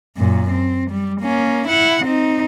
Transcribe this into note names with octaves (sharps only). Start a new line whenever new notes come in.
F#2 A#2
C4
G3
A#3 C#4
E4 F#5
C4 D#4